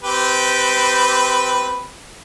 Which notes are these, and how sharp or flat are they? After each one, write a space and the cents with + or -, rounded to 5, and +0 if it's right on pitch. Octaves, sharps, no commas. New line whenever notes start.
C4 -20 G4 -10 B4 +0